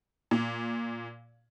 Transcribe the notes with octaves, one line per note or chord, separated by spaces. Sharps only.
A#2